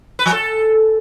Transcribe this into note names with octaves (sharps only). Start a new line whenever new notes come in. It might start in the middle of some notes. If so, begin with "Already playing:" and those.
B4
F3
A4